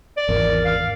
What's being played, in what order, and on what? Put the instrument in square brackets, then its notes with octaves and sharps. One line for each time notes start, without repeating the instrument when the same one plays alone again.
[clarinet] D5
[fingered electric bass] G#1 E2 [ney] A#4
[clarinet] F5